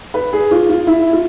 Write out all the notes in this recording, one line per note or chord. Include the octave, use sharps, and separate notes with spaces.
B4
G#4
F4
F4
E4
F4